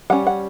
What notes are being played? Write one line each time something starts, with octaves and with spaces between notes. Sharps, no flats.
G3 C#4 F#5
F#5